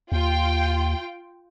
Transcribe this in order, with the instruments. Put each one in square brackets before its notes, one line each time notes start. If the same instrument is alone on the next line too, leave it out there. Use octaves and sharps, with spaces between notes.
[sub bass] D#2 [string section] F4 G5